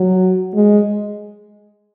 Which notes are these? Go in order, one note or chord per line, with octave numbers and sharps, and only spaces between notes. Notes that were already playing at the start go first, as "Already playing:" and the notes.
Already playing: F#3
G#3